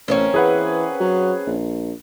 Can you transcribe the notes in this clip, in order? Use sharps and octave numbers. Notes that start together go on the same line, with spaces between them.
A1 A#3 C4 C#4
E3 G#4 B4 F#5
F#3
A#1